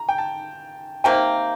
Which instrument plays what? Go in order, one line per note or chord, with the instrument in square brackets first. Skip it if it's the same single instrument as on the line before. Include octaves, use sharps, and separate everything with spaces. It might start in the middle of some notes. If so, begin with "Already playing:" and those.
Already playing: [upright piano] A#5
G5
A5
[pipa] C3 D#3 A#3 [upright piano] G5